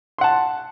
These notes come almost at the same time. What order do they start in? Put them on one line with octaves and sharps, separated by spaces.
C6 F#5 A5